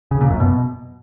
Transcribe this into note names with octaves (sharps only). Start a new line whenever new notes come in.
C#3
A#2
F#2
B2